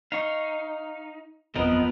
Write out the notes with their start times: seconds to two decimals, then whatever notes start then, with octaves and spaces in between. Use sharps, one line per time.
0.12 D#4 F5 C#6
1.55 F#1 E2 F3 B3 C4 A#4 B4 D#5